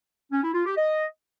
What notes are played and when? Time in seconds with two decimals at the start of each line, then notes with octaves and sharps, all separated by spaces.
0.32 C#4
0.43 E4
0.55 F4
0.66 G4
0.77 D#5